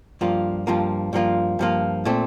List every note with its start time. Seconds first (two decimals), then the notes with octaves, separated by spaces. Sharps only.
0.21 G2 F3 A#3 F4
0.67 G2 F3 A#3 F4
1.13 G2 F3 A#3 F4
1.59 G2 F3 A#3 F4
2.05 A#2 A3 C4